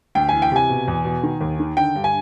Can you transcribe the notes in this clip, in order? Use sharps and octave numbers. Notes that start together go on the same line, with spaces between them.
D2 G5
E3 G#5
G5
C3 G#5
B2
E2
B2
D#3
D#2
D#3
D3 G5
G2
G#5